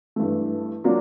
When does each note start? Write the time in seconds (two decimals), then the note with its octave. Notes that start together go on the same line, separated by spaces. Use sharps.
0.16 G2 E3 A3
0.84 F#3 A#3 D4 F4